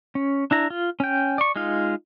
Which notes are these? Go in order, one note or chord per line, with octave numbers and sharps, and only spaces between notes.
C#4
D4 E4 A#5
F4
C#4 G5
D5 C#6
G#3 D#4 F4 F5